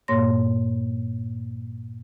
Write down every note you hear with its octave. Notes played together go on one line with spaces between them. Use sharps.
G2 A#2 A#3 C#5 C6 A#6